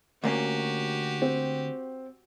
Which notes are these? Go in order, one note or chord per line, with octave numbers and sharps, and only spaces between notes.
D2 A#3 C#4 F#4 G4
C4